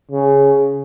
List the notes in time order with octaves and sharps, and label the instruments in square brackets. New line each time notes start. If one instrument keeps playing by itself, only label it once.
[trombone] C#3